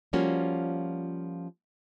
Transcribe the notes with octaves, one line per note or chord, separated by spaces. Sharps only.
F3 G3 A#3 C#4 F4 F#4